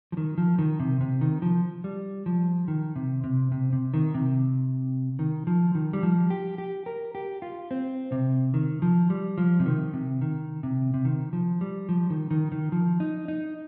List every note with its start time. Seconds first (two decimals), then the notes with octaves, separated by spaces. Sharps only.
0.12 F3
0.17 D#3
0.38 F3
0.59 D#3
0.80 C3
1.01 C3
1.21 D#3
1.42 F3
1.84 G3
2.26 F3
2.68 D#3
2.96 C3
3.24 C3
3.52 C3
3.73 C3
3.94 D#3
4.14 C3
5.19 D#3
5.47 F3
5.75 D#3
5.93 G3
6.03 F3
6.30 G4
6.58 G4
6.86 A#4
7.15 G4
7.42 F4
7.71 C4
8.12 C3
8.54 D#3
8.82 F3
9.10 G3
9.38 F3
9.60 C3
9.66 D#3
9.93 C3
10.21 D#3
10.63 C3
10.94 C3
11.05 D#3
11.33 F3
11.61 G3
11.89 F3
12.10 D#3
12.31 D#3
12.52 D#3
12.72 F3
13.00 D#4
13.28 D#4